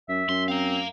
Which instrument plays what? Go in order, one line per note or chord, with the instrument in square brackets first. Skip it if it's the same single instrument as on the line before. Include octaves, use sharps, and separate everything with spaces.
[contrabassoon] F#2 [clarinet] E5
[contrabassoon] F#2 [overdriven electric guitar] C6
[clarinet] C4 [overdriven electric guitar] F5 A#5